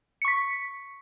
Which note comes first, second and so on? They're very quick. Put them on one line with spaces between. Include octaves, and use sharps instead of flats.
C#7 C#6 B6